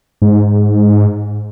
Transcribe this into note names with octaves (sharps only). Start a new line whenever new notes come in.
G#2